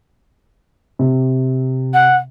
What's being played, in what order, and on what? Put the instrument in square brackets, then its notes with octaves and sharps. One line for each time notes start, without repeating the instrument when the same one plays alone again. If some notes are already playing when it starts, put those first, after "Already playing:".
[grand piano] C3
[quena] F#5